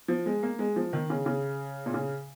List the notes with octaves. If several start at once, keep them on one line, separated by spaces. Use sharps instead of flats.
F3
G#3
A#3
G#3
F3
D#3
C#3
C#3
A#2
C#3